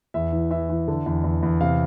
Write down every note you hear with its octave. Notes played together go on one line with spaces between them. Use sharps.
E2 E5
E3
E3 E5
E3
D3
E2
E2
E2
C3 F5